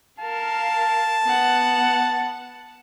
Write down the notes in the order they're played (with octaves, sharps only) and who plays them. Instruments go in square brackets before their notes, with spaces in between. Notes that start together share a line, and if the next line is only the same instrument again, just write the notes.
[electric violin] A#4 F5 [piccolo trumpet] A5
[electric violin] B3 F#5